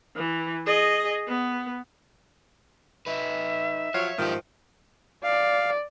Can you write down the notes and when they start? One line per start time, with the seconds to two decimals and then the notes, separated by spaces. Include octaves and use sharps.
0.16 E3
0.66 G#4 D#5
1.28 B3
3.06 D#4 B4 E5
3.94 F3 F#3 C#5 F5
4.18 G#2 D#3 F3 G4
5.24 D5 F5